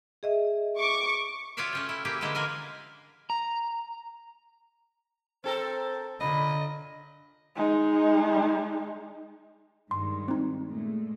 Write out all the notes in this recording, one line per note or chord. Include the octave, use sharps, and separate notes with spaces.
G#4 D#5 E5
C#6 D6
F4 F#4 C#5 D5 E5 F5
A3 C#4 G5
E4
A#3 E4 G4 G#4
D3 E3 G#3 A#3 E4
A#3 F4 A#4 G#5
A#5
C4 A4 A#4 C5
A#2 D3 D#5 B5
G#3 D#4
G2 D#3 G#3 C6
C4 D#4
A#2 G#3 A3